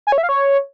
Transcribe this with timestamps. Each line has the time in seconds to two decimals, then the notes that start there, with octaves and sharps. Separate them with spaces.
0.07 G#5
0.12 C#5
0.18 E5
0.23 F5
0.29 C#5